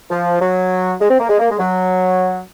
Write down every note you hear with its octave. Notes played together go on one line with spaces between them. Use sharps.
F3
F#3
G#3
C4
A#3
G#3
A#3
G#3
F#3